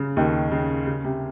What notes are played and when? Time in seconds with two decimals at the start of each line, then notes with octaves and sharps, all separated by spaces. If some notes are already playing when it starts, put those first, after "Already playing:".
Already playing: C#3
0.17 D#2 D#3
0.51 C#3
0.87 C#3
1.05 C3